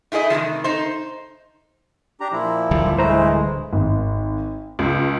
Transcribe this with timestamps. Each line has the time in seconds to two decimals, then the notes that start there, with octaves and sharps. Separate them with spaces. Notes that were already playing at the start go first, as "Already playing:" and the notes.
0.12 D#4 E4 G#4 B4 D#5
0.30 A2 C3 D#3 F3
0.64 D#4 C5
2.21 D4 G4 A#5
2.32 A#2 F3 E4
2.71 D1 D3 G3
2.99 E3 G#3 A3 E4 C5 A#5
3.73 G#1
4.79 C#2